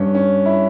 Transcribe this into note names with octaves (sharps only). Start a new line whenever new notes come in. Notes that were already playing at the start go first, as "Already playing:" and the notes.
Already playing: G2 C#4
C#4
E4